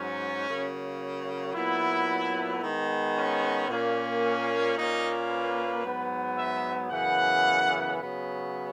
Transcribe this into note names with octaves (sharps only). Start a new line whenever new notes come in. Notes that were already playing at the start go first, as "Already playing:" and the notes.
Already playing: G#2 F#3 C#4
C#3 F#3 A#3
A#2 F#3 B3 E4
D#3 G#3 B3
C#4
A#2 A#3 C#4
A#2 A#3 C#4 D#4
B4
G#2 F#3 B3
E5
F#2 C#3 E3 B3 F#5
C#3 F#3 B3